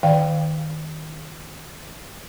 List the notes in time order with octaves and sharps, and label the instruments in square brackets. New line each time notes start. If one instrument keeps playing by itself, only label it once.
[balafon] D#3 D5 F5 G5